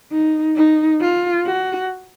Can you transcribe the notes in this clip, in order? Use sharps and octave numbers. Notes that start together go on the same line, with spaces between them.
D#4
D#4
F4
F#4